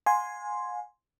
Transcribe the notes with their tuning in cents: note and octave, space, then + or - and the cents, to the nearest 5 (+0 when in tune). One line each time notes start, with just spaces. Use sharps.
F5 +45 G#5 +0 C6 +0